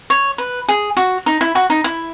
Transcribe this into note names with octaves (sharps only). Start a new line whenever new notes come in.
C#5
B4
G#4
F#4
D#4
E4
F#4
D#4
E4